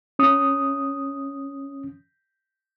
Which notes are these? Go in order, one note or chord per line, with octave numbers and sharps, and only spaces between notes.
C#4 D#6